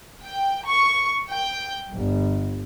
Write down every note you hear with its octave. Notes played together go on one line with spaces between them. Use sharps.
G5
C#6
G5
G1